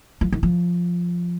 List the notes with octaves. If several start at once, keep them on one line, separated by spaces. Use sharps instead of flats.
F3
D#3
F3